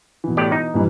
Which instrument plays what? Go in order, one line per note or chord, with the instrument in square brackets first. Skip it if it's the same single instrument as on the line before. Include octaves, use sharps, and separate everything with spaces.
[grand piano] B2 E3
[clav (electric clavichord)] A2 G4 D5
D#4
[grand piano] G2 A#2 E3